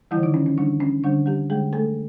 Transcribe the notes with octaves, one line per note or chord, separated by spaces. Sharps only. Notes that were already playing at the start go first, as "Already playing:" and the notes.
D3 E3 G3 E4
D#3 D#4
C#4
C#4
D3 G3 D4
C#4
D3 G3 D4
G3 G4
D3 G3 G#3 G#4
A3 A4